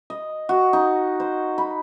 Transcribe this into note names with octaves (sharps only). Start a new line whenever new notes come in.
D#5
F#4
D#4
C5
B5